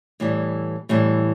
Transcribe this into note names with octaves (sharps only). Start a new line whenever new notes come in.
A2 E3 G3
A2 E3 G3